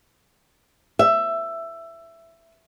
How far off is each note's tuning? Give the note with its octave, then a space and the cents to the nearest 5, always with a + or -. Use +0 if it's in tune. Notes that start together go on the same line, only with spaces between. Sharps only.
E5 +15